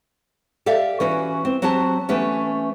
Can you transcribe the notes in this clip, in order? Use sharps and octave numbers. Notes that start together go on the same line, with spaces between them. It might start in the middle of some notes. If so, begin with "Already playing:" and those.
G4 A4 D5 E5 F5
E3 C#4 F#4
C4
F#3 C4 F#4 G4 A5
E3 A3 B3 C#4 G4